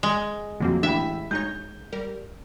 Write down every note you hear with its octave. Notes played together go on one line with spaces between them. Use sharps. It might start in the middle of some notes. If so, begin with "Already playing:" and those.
G#3
F2 D3 F#3 A#3 C4
A1 D4 E5 G5 B5
G#3 D#4 C#5 G6
G3 A#4